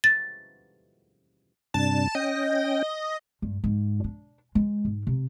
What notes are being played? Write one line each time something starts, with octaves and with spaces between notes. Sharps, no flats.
A6
G2 C3 D4 A5
C#4 D#5 G5
G2
G#2
D4
G#3
G#2
C3